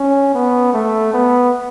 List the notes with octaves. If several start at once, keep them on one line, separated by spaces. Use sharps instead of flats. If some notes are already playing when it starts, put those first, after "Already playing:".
Already playing: C#4
B3
A3
B3